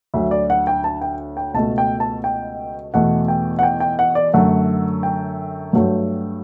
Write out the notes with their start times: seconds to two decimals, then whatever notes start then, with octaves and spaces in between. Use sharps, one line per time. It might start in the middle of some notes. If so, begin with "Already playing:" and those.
0.14 D2 D3 F#3 E5
0.31 D5
0.50 F#5
0.67 G5
0.84 A5
1.01 G5
1.37 G5
1.54 C#2 B2 A3 A5
1.78 G5
2.00 A5
2.24 G5
2.94 E2 B2 A3 F#5
3.28 G5
3.59 F#5
3.63 G5
3.80 G5
3.99 F#5
4.15 D5
4.34 F#2 D3 A3 F#5
5.03 G5
5.73 G2 F#3 A3